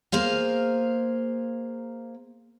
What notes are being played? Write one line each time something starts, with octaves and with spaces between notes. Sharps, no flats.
A#3 G#4 C5 F5